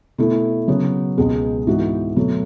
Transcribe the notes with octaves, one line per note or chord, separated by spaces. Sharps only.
B2 A3 E4
C#3 F#3 B3
C#2 B2 G#3
G#2 E3 B3 F#4
B2 F#3 A3